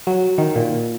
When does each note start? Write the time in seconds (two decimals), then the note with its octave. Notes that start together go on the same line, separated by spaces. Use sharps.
0.07 F#3
0.38 D#3
0.56 A#2